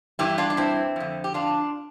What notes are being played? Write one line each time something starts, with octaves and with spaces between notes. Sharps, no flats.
G2 E3 E4 G4
D4 F4
D4
C4 E4
F2 D3
G4
D4 F4